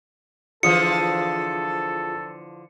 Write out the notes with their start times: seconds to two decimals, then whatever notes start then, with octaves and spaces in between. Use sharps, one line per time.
0.63 D3 E3 F3 F4 G#4 A4 D#6 C#7